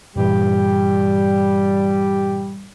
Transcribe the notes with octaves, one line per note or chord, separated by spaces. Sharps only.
G2 A#2 E3 G3 G4